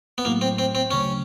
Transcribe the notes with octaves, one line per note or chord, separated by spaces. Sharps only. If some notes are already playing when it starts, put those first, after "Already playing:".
B3
A2 F#3 A3 A#3
C4
C4
C4
D2 C#3 F#3 C#4